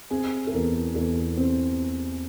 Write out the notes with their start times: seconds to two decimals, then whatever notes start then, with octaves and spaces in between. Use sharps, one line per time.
0.10 C4 G#4
0.47 A4
0.53 E2 A#4
0.95 E2 A4
1.37 C4